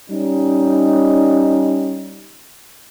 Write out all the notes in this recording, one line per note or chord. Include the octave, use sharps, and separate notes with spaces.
G3 C#4 D#4